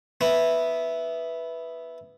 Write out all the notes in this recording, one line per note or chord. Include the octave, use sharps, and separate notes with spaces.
B3 E4